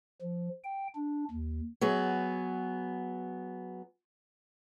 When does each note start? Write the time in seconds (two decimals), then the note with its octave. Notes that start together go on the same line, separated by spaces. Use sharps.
0.21 F3
0.64 G5
0.95 D4
1.31 D#2
1.81 F#3 B3 G#4